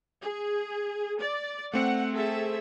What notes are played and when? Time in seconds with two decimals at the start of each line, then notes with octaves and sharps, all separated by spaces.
0.21 G#4
1.20 D5
1.73 A3 C4 F#5 C#7
2.13 G#4 A4 E5